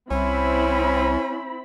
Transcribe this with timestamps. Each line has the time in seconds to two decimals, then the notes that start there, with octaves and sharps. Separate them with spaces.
0.11 C2 C4 C#4 E4 B5